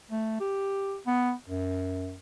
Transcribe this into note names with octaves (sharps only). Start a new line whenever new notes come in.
A3
G4
B3
F#2